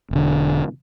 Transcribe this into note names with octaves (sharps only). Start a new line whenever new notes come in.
E1 D3